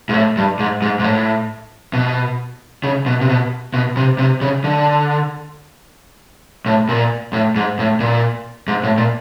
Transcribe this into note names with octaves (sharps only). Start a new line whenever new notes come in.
G#2
A2
G2
G#2
G#2
G#2
A2
B2
C#3
B2
C3
B2
B2
C3
C3
C#3
D3
A2
A#2
A2
G#2
A2
A#2
G#2
A2
A#2